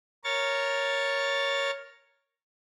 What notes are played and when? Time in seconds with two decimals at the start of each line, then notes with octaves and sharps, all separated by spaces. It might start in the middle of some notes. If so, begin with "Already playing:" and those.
0.24 A#4 C#5 C#6 A6